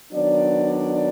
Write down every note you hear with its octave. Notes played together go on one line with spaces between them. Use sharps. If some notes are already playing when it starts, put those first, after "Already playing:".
D#3 F#3 B3 D4 D5